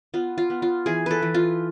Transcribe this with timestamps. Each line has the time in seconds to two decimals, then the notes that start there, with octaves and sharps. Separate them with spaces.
0.14 B3 F4
0.38 F4
0.50 B3
0.62 F4
0.86 E3 G#4
1.06 A4 B4
1.22 E3
1.34 F4